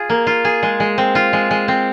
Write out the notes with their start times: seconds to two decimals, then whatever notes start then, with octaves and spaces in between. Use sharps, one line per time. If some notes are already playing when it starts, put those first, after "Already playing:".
Already playing: F4 G#4
0.09 A#3
0.27 F4
0.45 G#4
0.63 G#3
0.80 G#3
0.98 C4
1.15 F4
1.33 G#3
1.51 G#3
1.68 C4